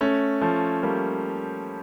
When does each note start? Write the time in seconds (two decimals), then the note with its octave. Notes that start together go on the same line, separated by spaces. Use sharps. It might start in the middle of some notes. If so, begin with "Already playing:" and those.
0.01 A3 C#4
0.41 F3 A3
0.83 G3 A#3